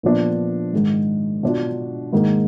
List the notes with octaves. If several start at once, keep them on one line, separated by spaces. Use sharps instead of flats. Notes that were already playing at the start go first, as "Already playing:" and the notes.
A#2 F3 B3 D4
G#2 D#3 G#3
B2 F#3 D4 F4
G#2 D#3 A#3